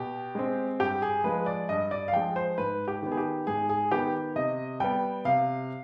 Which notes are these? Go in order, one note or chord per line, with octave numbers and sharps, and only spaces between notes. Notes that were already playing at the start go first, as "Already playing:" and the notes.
Already playing: B2 G4
G#3 C4
G2 G4
G#4
F3 G#3 B4
D5
G2 D#5
D5
F5
F3 G#3 G5
C5
G#2 B4
G4
D#3 B3
G#4
G4
G#2 G#4
G#4
D#3 B3 G4
C3 D#5
G3 B3 G5
C3 F5